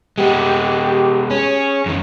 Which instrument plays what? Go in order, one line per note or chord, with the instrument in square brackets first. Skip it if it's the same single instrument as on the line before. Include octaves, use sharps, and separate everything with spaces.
[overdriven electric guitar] G#3 B3 [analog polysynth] G4 G5
[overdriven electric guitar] C#4 [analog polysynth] G#4 C#5
[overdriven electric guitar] F#2 D#3